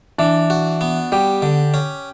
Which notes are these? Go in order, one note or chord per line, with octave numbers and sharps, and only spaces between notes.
E3 D4
F#4
B3
G3 G4
D3
C#4